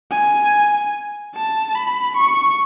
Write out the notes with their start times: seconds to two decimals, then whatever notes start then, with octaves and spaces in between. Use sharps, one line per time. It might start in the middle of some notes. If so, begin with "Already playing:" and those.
0.12 G#5
1.35 A5
1.75 B5
2.17 C#6